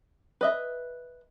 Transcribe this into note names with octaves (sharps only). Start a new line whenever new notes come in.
B4 D#5 E5